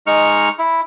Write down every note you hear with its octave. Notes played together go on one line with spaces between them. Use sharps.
G#3 D#4 C#6 F6
E4